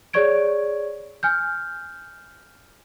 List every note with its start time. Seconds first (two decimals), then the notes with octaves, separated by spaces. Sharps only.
0.13 G#4 C#5 D5 C#6 G#6 D7
1.23 G#5 F6 G6